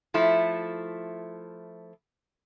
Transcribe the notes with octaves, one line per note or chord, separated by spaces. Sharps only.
F3 A3 E4